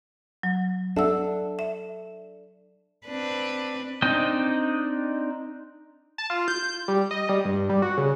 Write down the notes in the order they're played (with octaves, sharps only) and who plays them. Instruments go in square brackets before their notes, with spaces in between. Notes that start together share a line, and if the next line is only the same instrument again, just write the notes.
[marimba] F#3
[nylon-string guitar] D4 A4 [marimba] E5 F#5 E6
[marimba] E5
[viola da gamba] C4 D4 B4
[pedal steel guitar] C4 D4 D#4 D#5 G5
[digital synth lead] A5
F4
G6
G3
D#5
G3
G2
G3
F#4
C#3